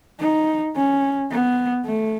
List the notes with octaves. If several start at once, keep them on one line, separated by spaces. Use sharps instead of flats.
D#4
C#4
B3
A3